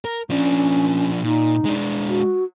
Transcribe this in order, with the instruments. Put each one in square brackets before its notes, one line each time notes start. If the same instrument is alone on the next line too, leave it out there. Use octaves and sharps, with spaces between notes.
[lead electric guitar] A#4
[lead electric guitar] F3 D4 [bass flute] C#4
[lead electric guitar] A#2 [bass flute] D#4
[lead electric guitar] G#3 D4
[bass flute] F#4